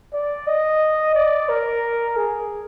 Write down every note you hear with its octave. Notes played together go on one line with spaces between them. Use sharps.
D5
D#5
D5
A#4
G#4